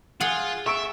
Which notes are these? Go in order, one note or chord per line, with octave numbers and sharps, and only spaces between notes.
F4 G#4 F#5
E5 C#6 E6 D7